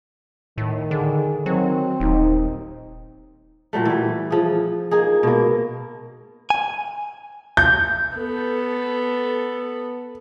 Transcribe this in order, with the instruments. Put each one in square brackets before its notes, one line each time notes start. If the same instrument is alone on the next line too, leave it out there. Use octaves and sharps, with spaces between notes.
[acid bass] A2 [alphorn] D#3
[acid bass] D3 [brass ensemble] G#4
[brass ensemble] D#3 [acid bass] F#3 [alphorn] C4
[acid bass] D#1 [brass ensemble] D#4
[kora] A#2 F#3 G3 A3
E3 G3
F3 G#4
A#3 D#4 G#4
B2 A#3
[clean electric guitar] G#5
[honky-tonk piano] G6
[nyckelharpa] B3 [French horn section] A4